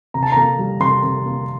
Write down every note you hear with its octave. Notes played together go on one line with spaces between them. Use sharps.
C3 A#5
A5
A#3 A#5
G3
C3 C6
C3
A#3